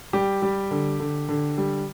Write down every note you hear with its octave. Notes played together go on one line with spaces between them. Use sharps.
G3 G4
G3
D3
D3
D3
G3